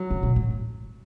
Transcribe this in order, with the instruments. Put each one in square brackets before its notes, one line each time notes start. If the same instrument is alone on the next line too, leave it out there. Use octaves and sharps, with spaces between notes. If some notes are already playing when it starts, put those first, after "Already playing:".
Already playing: [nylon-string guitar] F#3
[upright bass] C#3
B2
A2